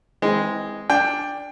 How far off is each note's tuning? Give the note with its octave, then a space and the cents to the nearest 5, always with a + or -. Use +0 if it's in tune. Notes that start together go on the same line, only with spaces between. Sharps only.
E3 -30 G#3 -5 C4 +0
D4 +0 G5 +15